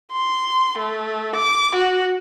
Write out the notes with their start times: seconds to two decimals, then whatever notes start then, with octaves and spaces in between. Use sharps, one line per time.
0.12 C6
0.78 A3
1.36 D6
1.75 F#4